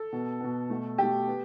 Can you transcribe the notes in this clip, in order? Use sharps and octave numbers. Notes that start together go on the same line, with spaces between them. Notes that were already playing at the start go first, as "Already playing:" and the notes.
Already playing: A4
B2 B3
B2 B3
B2 A3
B2 A3 G4
B3